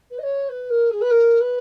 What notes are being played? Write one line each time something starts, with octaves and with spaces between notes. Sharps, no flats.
B4
D#5
C#5
B4
A#4
G#4
B4
A#4
B4